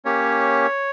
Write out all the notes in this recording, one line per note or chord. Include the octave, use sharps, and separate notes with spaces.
A#3 C#4 G4 C#5